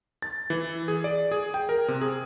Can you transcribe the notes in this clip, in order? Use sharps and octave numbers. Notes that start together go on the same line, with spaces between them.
A6
E3
G#4
D5
G#4
G5
A#4
C3
G#4